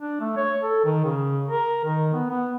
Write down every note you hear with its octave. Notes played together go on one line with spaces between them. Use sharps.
D4
A3
C#5
A4
D#3
C#3
A#4
D#3
B3
B3